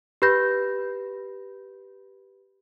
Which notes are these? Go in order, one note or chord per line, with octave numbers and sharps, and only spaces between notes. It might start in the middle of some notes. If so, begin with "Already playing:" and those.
G4 B4 B5 G6 A#6